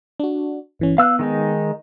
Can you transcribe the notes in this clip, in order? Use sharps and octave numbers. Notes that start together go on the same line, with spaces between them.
D4 F#4
G1 E3 C#4
B3 F5 E6 F#6
D#3 G#3 D#4